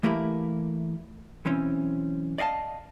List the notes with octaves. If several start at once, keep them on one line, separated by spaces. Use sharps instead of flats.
E3 A3 A#3 E4 G4 B5
B1 E3 C4 C#4
D5 D#5 F5 G#5 A5